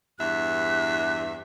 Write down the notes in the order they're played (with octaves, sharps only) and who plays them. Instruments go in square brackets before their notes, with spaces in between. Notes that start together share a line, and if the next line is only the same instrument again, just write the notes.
[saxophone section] E2 G2 E5 [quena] F#6